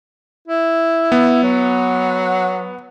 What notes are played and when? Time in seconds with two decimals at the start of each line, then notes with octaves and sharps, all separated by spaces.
0.48 E4
1.12 B3
1.43 F#3